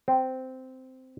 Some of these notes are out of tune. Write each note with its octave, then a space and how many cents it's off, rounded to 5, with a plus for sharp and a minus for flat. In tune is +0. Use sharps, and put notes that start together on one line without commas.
C4 -10